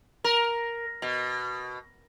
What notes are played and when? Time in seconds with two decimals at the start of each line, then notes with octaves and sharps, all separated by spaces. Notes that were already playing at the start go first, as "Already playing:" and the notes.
0.24 A#4
1.02 B2